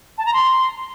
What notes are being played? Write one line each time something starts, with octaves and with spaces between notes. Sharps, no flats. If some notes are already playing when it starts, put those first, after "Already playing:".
A5
A#5
C6